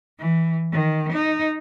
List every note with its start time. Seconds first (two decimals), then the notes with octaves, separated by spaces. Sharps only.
0.19 E3
0.72 D#3
1.13 D#4